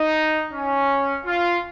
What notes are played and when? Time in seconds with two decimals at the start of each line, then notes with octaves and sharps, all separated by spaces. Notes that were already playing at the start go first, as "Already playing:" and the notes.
Already playing: D#4
0.53 C#4
1.25 F4